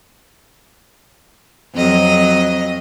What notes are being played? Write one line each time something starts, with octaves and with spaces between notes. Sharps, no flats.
F2 F#3 D#5